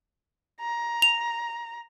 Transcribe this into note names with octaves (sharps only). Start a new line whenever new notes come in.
A#5
F7